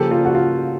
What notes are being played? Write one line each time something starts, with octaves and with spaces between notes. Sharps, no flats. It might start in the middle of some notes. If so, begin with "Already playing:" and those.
Already playing: C#3 F3 A#3 G4 A4
F4 G4
F#4
F4